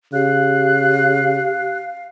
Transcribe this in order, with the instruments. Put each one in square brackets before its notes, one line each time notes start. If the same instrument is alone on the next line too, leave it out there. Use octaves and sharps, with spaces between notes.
[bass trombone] C#3 [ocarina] G4 [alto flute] F5 [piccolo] F#6